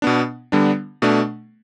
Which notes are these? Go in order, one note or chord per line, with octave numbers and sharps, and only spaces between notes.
B2 B3 D4
D3 G3 B3 D4
B2 A3 D4